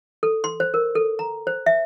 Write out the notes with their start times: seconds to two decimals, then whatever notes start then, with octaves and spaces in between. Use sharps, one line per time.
0.23 A4
0.44 C6
0.60 C5
0.74 A#4
0.95 A4
1.19 A#5
1.47 C5
1.66 E5